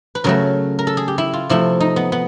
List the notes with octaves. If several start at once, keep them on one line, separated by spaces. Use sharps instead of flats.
B4
C#3 F#3 A3 A#4
A#4
A4
G#4
G4
E4
F4
C3 F3 A3 E4
D#4
B3
B3